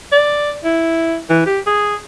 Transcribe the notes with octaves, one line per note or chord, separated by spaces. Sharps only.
D5
E4
E3
G4
G#4